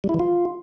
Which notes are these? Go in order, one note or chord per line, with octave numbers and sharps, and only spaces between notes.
G3
E4
E3
F4